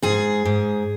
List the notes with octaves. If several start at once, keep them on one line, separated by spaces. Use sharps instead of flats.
G#2 G#4
G#2